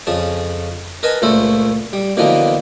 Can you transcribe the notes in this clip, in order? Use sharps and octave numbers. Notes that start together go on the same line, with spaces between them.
F2 C#3 G#4 A5
A#4 B4 D#5 G#5 A5
C#2 A#2 A3 C5 E5 B5
G3
B2 D3 E3 F3 A#3 B3